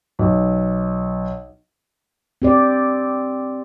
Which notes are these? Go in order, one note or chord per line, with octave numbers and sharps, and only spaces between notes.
B1
C4 G4 D5